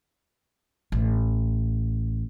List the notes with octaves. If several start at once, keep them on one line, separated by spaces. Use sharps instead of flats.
A1